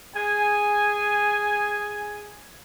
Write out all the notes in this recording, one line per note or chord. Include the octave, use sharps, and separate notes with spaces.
G#4 G#5